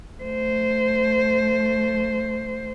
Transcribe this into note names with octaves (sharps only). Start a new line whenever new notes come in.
A3 C5